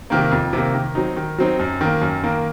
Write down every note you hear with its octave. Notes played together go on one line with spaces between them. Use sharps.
C3 D#3 A#3
F2
C3 D#3 A#3
D#3
F#3 C4 D#4
D#3
F#3 C4 D#4
F#2
D#3 A#3
F#2
D#3 A#3